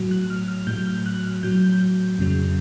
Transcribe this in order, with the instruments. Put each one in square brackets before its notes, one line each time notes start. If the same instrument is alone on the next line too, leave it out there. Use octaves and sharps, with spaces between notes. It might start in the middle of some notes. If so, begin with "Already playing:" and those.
Already playing: [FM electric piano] A2 F#3
F#6
F6
F6
A2 F#3 G6
F6
F#6
F6
A2 F#3 G6
F2 C#3 F#3